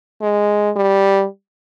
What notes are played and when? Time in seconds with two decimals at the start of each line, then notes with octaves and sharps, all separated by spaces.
0.22 G#3
0.76 G3